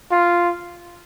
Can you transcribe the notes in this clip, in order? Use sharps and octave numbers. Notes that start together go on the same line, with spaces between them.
F4